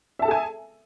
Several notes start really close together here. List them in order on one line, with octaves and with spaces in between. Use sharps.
E5 A5 A4 G#4 G#5